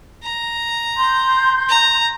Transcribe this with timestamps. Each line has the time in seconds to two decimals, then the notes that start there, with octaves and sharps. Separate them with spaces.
0.23 A#5
0.97 C6 G6
1.69 A#5